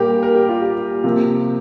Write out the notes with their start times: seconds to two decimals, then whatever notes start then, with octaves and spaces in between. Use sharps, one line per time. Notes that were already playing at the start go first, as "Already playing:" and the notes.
Already playing: A#2 G3 A#3 G4 A#4
0.23 A#4
0.35 G4
0.49 F4
0.62 G4
1.04 C3 F3 A#3